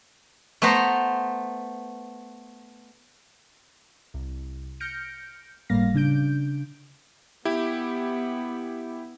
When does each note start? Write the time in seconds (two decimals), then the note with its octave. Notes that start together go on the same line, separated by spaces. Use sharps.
0.62 A3 B3 B4 C5 A#5
4.14 C2
4.80 F6 G6 A#6 C#7 D7
5.70 G1 A2 G3 A#3 F5 A#6
5.94 C#3 D4 G6 D7
7.45 B3 E4 G4